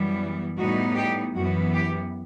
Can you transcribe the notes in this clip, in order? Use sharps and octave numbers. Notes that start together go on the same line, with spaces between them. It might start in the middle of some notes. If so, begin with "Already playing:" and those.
Already playing: F#2 E3 G3 B3
A2 G3 B3 D#4 F#4
G4
F#2 E3 B3 F#4
G4